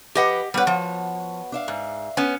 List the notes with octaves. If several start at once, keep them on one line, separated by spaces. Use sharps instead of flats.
F3 G4 B4 D#5 F#5
G3 B3 F#4 B4 C#5
F3
D4 E5 F5
G#2
B3 C#4